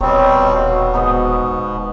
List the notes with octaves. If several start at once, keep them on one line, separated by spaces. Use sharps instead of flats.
D#1 B2 D#3 G3 C4 C#5
B2 F#4 F5
G#2 B3 D#4